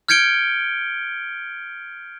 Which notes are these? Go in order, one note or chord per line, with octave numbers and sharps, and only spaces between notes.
F6 G6 G#6 C#7 D7 G7